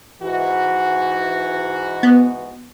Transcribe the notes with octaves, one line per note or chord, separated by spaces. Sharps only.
G#2 E3 F#4
B3